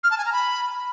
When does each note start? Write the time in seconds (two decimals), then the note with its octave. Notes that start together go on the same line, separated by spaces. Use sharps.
0.04 F6
0.11 A5
0.18 G#5
0.25 A#5
0.33 B5